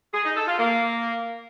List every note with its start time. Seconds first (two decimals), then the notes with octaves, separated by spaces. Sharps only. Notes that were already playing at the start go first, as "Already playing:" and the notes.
0.13 G#4
0.24 D#4
0.36 A4
0.47 F4
0.58 A#3